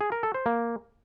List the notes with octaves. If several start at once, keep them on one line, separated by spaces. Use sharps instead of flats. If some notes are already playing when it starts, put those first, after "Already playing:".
G#4
A#4
A4
C5
A#3